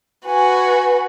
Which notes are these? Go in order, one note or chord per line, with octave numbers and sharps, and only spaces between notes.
F#4 B4 G#5